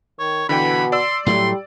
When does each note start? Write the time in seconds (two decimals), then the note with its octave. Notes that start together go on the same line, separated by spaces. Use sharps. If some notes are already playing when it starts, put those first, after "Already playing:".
0.20 D#3 C#5
0.49 B2 D3 E3 G5 B5
0.92 D5 C6 E6
1.26 A2 F#3 G3 A3 C6